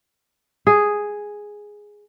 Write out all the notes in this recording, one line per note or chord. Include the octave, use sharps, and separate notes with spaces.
G#4